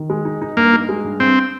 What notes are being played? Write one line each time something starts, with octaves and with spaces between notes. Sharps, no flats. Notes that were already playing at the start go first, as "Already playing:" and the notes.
Already playing: D#3
G#3
D#4
D#4
G2 A#3
D#4
G#3
G2
G2 C4